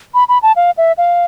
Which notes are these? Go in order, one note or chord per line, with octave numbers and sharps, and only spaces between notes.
B5
B5
A5
F5
E5
F5